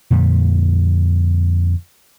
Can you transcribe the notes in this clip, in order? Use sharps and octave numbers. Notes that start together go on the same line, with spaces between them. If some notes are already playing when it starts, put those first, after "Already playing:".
F2 A#2 D3 G3